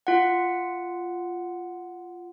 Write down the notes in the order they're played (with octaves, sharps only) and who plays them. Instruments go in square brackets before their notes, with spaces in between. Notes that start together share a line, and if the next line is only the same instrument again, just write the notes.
[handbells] F4 F#5